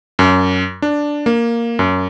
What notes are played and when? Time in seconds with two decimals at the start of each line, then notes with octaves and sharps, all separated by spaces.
0.19 F#2
0.82 D4
1.26 A#3
1.79 F#2